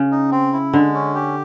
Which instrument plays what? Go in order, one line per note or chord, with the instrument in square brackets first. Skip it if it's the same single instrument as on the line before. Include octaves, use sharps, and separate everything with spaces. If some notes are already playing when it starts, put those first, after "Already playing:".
Already playing: [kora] C#3
[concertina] D#4
C4
E4
[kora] D3 [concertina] G#3
[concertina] C#4
G4